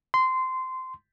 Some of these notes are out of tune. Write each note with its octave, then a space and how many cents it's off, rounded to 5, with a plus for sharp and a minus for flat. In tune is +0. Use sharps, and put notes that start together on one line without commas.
C6 -15